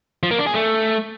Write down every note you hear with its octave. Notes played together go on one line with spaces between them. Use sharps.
F3
A#3
D4
G#4
A3